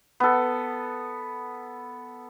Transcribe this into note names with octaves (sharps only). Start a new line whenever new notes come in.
B3 A4